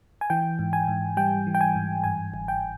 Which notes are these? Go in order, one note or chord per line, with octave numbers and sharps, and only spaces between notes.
G#5
E3 G5
G#2
G#5
G#2
G3 G5
E3
G5
G#5
G#2
G2 G#5
G1
G5